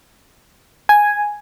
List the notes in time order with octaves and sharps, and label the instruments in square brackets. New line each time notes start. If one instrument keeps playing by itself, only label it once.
[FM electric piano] G#5